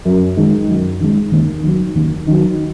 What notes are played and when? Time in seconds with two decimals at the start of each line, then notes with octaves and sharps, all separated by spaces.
0.05 F#2
0.36 D#3 G#3
0.68 F#2
1.00 D#3 G#3
1.32 D#2
1.63 D#3 F#3
1.95 D#2
2.27 D#3 F#3